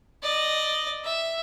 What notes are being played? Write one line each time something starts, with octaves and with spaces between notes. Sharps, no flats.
D5 D#5
E5